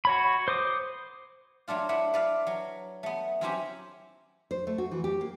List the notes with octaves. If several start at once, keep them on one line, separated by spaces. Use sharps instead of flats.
F#4 C#5 B5
C5 D6 D#6
F#3 A3 D4 F4
D4 E4 B4 F#5
B4 D5 F5
F#3
A3 B3
F#3 C4 C#4 E4 F#4 G4
C5
A3
F#4
E3
G4
A#3